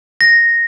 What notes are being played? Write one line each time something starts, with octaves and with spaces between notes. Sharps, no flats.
A#6